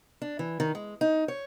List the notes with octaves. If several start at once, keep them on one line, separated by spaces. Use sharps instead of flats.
D4
E3
D#3
G#3
D#4
C#5